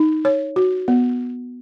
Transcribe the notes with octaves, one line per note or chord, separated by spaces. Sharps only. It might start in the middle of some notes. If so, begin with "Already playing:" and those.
Already playing: D#4
C#5
F#4
B3